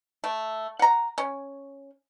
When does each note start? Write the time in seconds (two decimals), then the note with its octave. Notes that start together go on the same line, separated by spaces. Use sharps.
0.24 A3
0.79 F#5 A#5
1.18 C#4